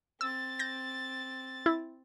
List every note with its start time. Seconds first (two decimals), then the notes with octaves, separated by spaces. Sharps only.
0.21 C4 E6 A6
0.59 G6 A#6
1.66 E4